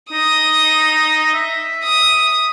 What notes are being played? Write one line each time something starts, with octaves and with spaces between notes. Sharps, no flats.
D#4 D#6
E5
D#6